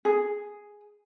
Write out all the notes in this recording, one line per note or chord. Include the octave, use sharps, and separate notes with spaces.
G#4